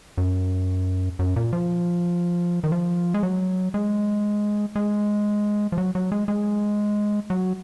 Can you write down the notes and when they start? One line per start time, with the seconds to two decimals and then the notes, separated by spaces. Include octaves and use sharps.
0.18 F#2
1.19 F#2
1.36 A#2
1.53 F3
2.64 D#3
2.72 F3
3.14 G#3
3.23 F#3
3.74 G#3
4.76 G#3
5.72 F3
5.78 F#3
5.95 F#3
6.12 G#3
6.28 G#3
7.30 F#3